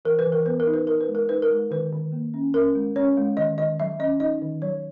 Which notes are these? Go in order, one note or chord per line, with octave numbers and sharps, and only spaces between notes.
E3 A#4
B4
E3
A#4
B3 B4
A#4
D#4
B4
D#4 A#4
B4
G#3
A#4
D#4 B4
A#4
G#3
D#3 B4
D#3
A#3
C#4
C#4 A#4
G#3
C#4 C#5
G#3
D#3 D#5
D#3 D#5
F#3 E5
C#4 D#5
D#4 D#5
D#3
F#3 C#5